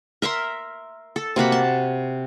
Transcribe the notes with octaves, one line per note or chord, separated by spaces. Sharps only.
A#4 E5 A#5 C6
A4
C3 A#3 F#4 B5
A5